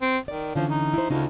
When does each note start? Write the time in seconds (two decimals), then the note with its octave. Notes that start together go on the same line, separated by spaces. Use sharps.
0.02 C4
0.28 D#3 D5
0.55 D3 E3 F3 C#4
0.70 D#4
0.94 E4 C5
1.10 D2 C#3 D#4 F4